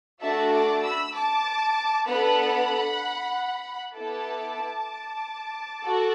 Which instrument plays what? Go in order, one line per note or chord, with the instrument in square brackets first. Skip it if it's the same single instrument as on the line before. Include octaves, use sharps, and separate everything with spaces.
[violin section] A3 D4 F#4 A4 E5 A5
A5 D6
B5 E6
A5 D6
B3 D4 A4 F#5 B5
B3 E4 A4 A5 D6
F#4 A4